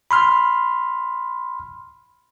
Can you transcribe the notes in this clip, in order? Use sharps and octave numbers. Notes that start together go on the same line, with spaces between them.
B5 C6 F6